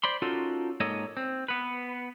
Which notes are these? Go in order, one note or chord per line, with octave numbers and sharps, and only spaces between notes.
C5 D5 B5 C6
C#4 D#4 F4 F#4 A4 A#4
G#2 A#3 A4 C#5 D#5
C4
B3 B4